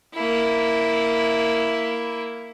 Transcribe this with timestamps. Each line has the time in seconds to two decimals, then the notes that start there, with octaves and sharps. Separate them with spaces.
0.14 A#3 E4